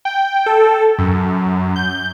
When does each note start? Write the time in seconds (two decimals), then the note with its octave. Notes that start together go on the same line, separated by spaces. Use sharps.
0.05 G5
0.46 A4
0.98 F#2
1.76 G6